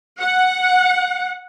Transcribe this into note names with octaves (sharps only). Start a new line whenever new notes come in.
F#5